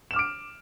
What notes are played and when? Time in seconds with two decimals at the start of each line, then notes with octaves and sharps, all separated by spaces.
0.11 E7
0.13 F6
0.16 D6
0.19 D7